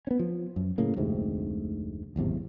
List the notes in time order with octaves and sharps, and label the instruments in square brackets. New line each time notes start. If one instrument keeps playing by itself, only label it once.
[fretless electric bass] B3 C#4
F3
F#2
A2 C#3 A#3
F1 D2 G#2 C3
D1 G#1 E2 C3